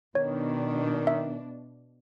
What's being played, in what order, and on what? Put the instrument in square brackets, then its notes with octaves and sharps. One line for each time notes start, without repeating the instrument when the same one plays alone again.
[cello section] B2 D4 [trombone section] D#3 [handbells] C#5
[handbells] E5